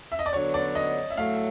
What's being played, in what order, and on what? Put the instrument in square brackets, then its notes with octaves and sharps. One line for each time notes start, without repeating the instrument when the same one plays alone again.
[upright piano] E5
D#5
D5
[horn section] D3 F#3 B3 D4 F#4 [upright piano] C#5
[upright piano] D5
D#5
E5
[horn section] A2 F#3 A3 [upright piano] F5